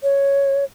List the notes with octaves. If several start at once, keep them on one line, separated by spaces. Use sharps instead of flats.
C#5